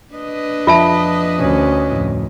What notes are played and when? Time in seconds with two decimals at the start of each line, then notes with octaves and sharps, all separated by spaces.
0.14 D4 B4 D#5
0.67 F2 F3 F4 E5 A5
1.39 D2 C#4
1.91 F2 A2